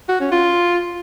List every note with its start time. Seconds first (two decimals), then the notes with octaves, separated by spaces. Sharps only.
0.09 F#4
0.20 C#4
0.32 F4